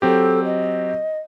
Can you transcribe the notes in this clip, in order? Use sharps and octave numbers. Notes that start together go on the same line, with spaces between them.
F#3 C4 G4 A4
D#5